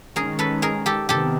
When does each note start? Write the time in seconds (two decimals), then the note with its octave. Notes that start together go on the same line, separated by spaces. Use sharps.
0.16 D#3 G#3 C#4 G#4 A#4
0.39 A4 B4
0.62 G#4 A#4
0.86 G4 A4
1.09 C3 D#3 B3 G4 A4